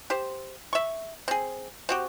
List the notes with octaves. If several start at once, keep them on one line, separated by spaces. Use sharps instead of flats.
G4 C5
E5 C#6
C4 G#4
C4 F#4 G4